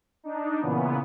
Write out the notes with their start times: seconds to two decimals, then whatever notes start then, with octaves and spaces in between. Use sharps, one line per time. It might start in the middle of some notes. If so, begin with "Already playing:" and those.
0.23 D4 D#4
0.61 A#2 C#3 E3 B3